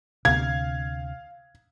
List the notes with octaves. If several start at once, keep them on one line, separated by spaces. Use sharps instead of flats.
D2 C3 F5 G#6